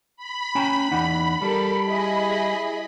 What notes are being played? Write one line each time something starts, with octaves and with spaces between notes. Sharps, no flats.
B5
C#4 G5 A#5
E2 D#4 F#5
G3 A4 A#4
E4 G#4 D#5